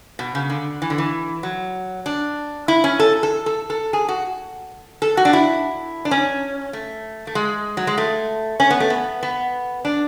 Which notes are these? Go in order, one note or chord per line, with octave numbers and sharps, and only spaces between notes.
B2
C#3
D3
E3
D3
E3
F#3
D4
E4
C#4
A4
A4
A4
A4
G#4
F#4
A4
F#4
D4
E4
D4
C#4
A3
A3
G#3
F#3
G#3
A3
C#4
B3
A3
B3
B3
D4